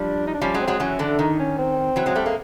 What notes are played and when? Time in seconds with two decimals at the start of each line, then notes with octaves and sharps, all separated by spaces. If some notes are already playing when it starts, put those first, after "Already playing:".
Already playing: F3 G3 D4
0.27 D#4
0.34 D4
0.41 F3 G3 C#4
0.54 F#3 G#3
0.61 C4
0.67 F#3 G#3
0.80 E3 F#3 C#4
0.99 D3 E3 D4
1.19 D#3 D#4
1.39 C#4
1.58 C4
1.96 E3 F#3
2.06 F#3 G#3
2.15 G3 A3
2.26 G#3 A#3